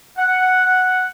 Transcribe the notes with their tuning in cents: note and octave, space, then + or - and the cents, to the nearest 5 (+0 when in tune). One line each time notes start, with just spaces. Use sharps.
F#5 +0